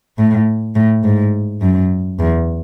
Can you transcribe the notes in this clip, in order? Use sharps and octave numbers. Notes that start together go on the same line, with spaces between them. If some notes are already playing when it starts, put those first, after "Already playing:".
A2
A2
G#2
F#2
E2